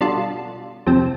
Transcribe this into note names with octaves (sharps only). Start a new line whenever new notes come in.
B2 G3 D4 F4 A4
F2 C3 F3 C4